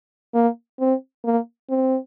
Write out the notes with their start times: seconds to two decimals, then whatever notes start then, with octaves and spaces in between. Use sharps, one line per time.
0.34 A#3
0.80 C4
1.25 A#3
1.70 C4